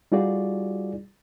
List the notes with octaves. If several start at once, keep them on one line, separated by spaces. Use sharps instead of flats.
G3 D#4 F4 F#4 G#4 D5